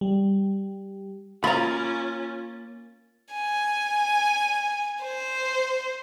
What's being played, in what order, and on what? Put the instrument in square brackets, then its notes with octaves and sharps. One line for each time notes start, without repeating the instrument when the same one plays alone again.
[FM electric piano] G3
[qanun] A#3 [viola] C#4 F4 [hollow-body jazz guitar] A#5 B5 [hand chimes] A6
[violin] G#5
C5